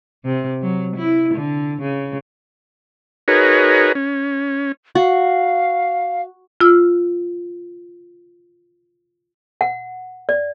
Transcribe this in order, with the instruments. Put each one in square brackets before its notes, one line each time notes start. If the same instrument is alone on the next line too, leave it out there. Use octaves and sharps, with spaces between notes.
[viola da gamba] C3
F#3
E4
D3
C#3
[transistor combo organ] D#4 F#4 G#4 A#4 B4 C#5
C#4
[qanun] F#4 [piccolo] F5
[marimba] F4 E6 F6
[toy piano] F#5
D5